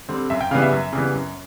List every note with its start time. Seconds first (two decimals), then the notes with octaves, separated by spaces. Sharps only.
0.09 D3 G3 C4
0.30 F#2 E5
0.41 G5
0.51 C#3 E3 G3 B3 F5
0.62 E5
0.72 F#2
0.93 C#3 E3 G3 B3
1.14 F#2